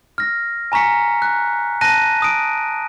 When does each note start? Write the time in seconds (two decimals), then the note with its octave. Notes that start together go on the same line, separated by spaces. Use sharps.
0.18 F6 A#6
0.72 G#5 A#5 C#6 B6 C#7
1.22 F#6
1.81 A5 F#6 A#6 D#7
2.22 D#6 D7